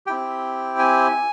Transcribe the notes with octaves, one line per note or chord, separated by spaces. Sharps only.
C4 E4 G4 G5
G#5